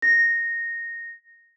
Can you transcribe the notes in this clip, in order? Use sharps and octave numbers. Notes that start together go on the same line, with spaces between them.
A#6